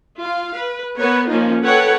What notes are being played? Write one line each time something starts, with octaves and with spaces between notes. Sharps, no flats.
F4 F5
B4
B3 A#4 B4 C#5
F3 A#3 C#4 D#4 F4
A4 B4 C#5 F#5 G5